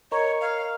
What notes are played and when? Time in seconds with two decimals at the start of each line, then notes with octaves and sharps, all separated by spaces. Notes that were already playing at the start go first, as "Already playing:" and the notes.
0.12 A#4 C#5 D#5 A#5 C#6
0.41 F5